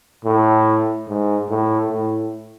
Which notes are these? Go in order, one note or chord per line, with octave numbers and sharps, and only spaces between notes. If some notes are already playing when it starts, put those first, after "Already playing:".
A2
G#2
A2
A2